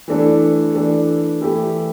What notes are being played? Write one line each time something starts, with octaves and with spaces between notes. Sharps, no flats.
E3 A3 D4 A4
E3 A3 D4 A4
E3 A3 E4 G4